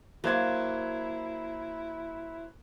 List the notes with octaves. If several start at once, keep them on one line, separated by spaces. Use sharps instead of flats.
F#3 A#3 E4 C5 G#6